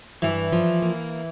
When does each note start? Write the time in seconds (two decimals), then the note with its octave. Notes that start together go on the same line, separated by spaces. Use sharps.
0.22 G2 E3
0.52 F3
0.82 A#3